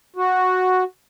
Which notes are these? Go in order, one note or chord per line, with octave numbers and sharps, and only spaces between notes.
F#4